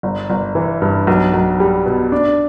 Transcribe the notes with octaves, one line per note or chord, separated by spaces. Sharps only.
G1
G1
E3
G2
B1
B1
G3
B2
D4